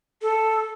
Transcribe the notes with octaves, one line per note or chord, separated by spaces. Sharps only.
A4